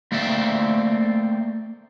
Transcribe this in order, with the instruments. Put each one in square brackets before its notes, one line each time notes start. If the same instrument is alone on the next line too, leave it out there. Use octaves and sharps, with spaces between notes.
[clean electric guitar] A3 A#3 C4 D5 E5